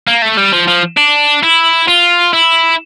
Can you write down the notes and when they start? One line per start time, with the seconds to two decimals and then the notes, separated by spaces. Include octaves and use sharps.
0.07 A#3
0.22 A3
0.37 G3
0.53 F3
0.68 F3
0.97 D4
1.44 E4
1.88 F4
2.33 E4